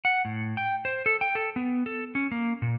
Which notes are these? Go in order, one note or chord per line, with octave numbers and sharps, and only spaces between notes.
F#5
A2
G5
C5
A4
G5
A4
B3
A4
C#4
A#3
A#2